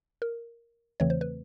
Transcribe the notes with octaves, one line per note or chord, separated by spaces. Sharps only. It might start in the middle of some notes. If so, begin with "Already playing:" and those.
A#4
E2 C#3 E3 A3 C4 C#5
C5
B4